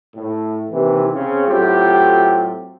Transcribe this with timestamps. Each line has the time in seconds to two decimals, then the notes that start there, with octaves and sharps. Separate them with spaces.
0.16 A2
0.71 D#2 C3 E3
1.13 C#3 C4 C#4
1.47 A2 F#3 C4 F4 G4